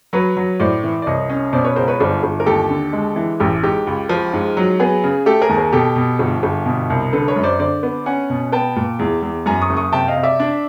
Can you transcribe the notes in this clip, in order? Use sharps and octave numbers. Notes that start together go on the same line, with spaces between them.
F#3 B4 C#5
F#3
A2 C5 D5
E3
D5
C2 C#5 D#5
C#4
B2 C5 D5
B4 C#5
C#2 A#4 C5
B4 C#5
G1 C5 D5
G1
A#4
D#2 G4 A4
D3
G#3
E3
A1 G4
G#2 G4
C#2
F3
G#2
F#3
B3 G#4
C#3
A3 G4 A4
G#4 A#4
D#2
G#4 A#4
B2 G4 A4
B2
G1
G1
B2
C2
D3 A4 B4
B4 C#5
F#2
C5 D5
D3 C5 D5
B3
C#4 F#5 G#5
B2
B3 G5 A5
A#2
E2
E2
F#2 G#5 A#5
C#6 D#6
F#1
C#6 D#6
C3 G5 A5
D#5 F5
C3
D5 E5
D4